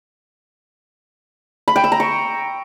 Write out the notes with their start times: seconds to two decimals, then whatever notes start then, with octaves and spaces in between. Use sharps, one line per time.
1.68 B5
1.76 G5
1.84 E6
1.92 A#5
2.00 C#6